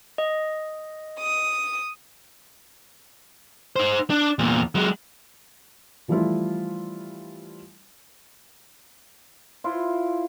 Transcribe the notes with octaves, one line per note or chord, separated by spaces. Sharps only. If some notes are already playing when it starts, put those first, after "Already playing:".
D#5
D#6
D#4 C5
D4
E2 A#2
F#3 G#3
E3 F3 G3 A3 E4 F4
E4 F4 C5